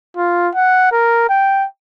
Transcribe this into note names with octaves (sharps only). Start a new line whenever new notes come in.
F4
F#5
A#4
G5